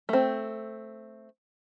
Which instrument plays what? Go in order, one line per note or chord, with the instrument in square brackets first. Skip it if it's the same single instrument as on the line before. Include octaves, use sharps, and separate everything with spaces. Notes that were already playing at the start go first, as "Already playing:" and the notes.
[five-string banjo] A3 C4